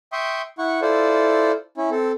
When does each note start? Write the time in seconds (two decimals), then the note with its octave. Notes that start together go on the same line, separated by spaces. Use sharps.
0.12 E5 G5 C6 C#6 D#6
0.58 E4 F#5 C#6
0.82 E4 F4 A4 C5 D5
1.77 C#4 E4
1.91 C4 A4